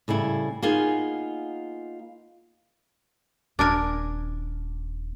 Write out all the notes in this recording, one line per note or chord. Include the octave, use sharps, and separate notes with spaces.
A2 C#3 G3 E4
A#3 B3 D#4 F4 G#4 G#5
D#1 A#3 D4 A#4 G#5